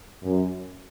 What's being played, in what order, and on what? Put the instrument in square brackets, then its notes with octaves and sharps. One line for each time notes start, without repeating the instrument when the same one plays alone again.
[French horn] F#2